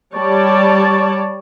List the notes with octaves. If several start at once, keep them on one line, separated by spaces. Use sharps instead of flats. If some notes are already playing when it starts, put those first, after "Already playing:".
G3 C#5 D5 A5